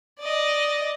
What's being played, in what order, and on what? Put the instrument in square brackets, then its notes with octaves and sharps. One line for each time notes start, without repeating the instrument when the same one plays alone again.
[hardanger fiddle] D5 D#5